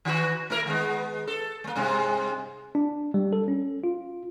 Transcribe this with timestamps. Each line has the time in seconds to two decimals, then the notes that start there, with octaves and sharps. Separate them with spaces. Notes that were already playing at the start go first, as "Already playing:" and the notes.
0.05 D#3 E3 F#4
0.50 A3 E4 A#4
0.65 D#3 G#3 B3
1.27 A4
1.64 G#3 A#3
1.76 G2 C3 G#3
2.75 D4
3.14 G3
3.33 A4
3.48 C#4
3.84 F4